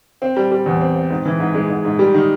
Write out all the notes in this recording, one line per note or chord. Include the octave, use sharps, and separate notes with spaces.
C4
G3
G3
E2
C4
C4
G#2
E3
G#2
G#3
G#2
G#2
G3
D#3